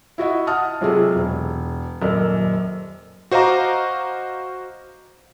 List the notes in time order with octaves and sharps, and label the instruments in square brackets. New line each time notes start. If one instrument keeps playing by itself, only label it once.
[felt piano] E4 F#4 D#5 E5
F#5 A5 D#6 F6
C3 F#3 G#3 F4 G#4 A4
E1
D#1 F#2 A4 A#4 D5 D#5
[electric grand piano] F#4 C5 D#5 F5 A#5 D6